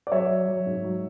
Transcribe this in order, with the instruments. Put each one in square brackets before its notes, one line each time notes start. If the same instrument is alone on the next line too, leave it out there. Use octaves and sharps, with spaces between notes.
[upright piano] D5
F#3 C#5 E5
F#3
F#3
G#2
F#3